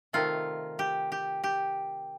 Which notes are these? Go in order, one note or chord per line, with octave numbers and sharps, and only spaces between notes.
C3 D#3 A3 F4
G4
G4
G4